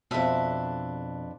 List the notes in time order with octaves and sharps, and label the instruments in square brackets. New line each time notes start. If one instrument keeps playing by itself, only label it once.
[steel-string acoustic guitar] F2 D4 [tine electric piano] B2 [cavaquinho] A4 B4 E5